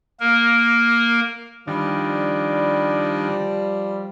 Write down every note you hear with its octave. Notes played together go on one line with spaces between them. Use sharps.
A#3 A#4
D#3 F3 G3 D4